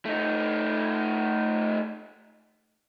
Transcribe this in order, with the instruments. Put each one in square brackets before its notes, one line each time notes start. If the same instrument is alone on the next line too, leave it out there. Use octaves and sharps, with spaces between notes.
[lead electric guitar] A3 D#4